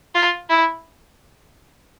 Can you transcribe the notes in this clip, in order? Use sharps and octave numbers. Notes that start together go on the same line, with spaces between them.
F4
E4